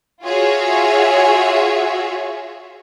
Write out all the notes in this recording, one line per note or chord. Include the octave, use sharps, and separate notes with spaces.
F4 F#4 G#4 C#5 E5